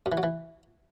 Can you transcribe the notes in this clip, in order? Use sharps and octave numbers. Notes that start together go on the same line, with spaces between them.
F#2
E3
F#3
E3